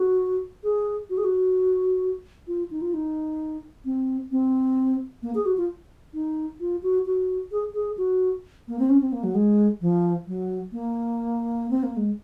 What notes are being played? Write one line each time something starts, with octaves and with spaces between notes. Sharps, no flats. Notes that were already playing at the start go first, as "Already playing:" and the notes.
Already playing: F#4
G#4
F#4
G#4
F#4
F4
D#4
F4
D#4
C4
C4
A#3
G#4
F#4
F4
D#4
F4
F#4
F#4
G#4
G#4
F#4
A#3
C4
C#4
C4
A#3
F#3
G#3
F3
F#3
A#3
C4
A#3
G#3